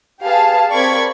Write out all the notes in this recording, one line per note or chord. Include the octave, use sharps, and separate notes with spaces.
G4 G#4 B4 F5 A5
C4 A#4 D5 B5 C#6 G#6